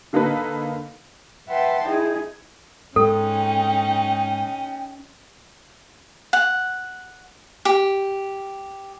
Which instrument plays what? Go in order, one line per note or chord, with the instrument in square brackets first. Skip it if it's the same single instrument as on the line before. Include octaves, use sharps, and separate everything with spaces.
[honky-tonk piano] D3 A#3 D#4 A4 B4
[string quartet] B4 E5 F#5 G5 A5 C6
D#4 E4 G#4
[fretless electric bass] G#2 [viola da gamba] C#4 D#4 [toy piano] A4 [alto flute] G5
[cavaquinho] F#5
G4